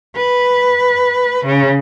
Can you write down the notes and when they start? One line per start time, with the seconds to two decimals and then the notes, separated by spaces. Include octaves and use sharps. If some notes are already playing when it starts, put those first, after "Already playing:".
0.16 B4
1.46 C#3